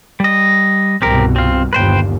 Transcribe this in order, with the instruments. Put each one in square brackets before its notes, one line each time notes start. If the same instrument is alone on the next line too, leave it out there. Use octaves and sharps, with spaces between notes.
[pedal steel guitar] G3 D#5
[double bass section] C2 G2 B2 [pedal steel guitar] C4 G4 A#4
[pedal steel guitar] C4 F4
[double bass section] G1 D#2 [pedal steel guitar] B4 C5 G5